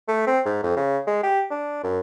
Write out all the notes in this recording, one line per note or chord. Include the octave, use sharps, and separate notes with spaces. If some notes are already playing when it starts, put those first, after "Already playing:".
A3
C4
G#2
F2
C#3
G#3
G4
D4
F#2